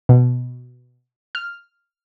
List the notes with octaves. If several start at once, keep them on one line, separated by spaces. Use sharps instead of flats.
B2
F6